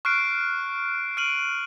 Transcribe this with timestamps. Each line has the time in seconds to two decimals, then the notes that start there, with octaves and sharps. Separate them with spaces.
0.05 C#6 F6 F#6 C7 D7
1.17 F6 D7 D#7 F#7